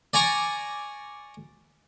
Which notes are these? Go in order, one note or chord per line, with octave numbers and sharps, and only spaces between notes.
D5 G#5 A#5 C#6